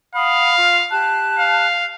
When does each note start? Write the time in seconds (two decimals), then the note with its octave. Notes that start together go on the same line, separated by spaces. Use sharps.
0.15 F5 F#5 B5 D#6
0.57 F4
0.91 G4 A5 F#6
1.39 F5